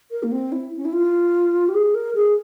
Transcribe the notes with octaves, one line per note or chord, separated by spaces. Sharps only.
A#4
A#3
C4
E4
C#4
E4
F4
G4
G#4
A#4
G#4